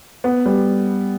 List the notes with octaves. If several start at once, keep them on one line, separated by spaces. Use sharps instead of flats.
B3
G3